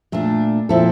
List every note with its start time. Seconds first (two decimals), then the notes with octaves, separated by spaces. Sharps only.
0.12 A#2 A3 D4
0.69 A#2 F3 C4 E4 A4